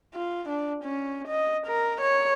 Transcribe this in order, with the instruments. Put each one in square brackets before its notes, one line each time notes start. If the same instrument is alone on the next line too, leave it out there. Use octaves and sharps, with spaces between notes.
[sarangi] F4
D4
C#4
D#5
A#4
C#5